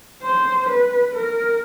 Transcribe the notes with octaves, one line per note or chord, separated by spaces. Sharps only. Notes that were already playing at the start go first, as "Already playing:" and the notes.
C5
B4
A#4